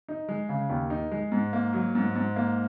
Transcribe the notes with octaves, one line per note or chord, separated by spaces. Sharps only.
D#4
G#3
C#3
D#2
D#4
G#3
G#2
A#3
F#3
G#2
G#2
A#3